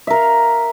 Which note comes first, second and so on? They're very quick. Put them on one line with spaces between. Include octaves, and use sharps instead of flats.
E5 A#4 F5